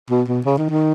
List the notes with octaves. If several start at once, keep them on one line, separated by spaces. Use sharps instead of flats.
B2
B2
C#3
D#3
D#3